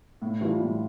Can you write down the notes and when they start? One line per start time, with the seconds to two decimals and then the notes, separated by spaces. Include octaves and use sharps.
0.22 A2
0.41 E3 G3 D4 F4
0.60 A2